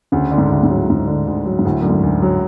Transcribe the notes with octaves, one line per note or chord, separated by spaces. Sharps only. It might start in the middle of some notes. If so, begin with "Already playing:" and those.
D2 C#3
D3
G#2
D2
G#2
F#3
A2
D2 G#2
D3
D2
F#3
G#2
D2 A2
F#2 D3
G#2
D2
F#3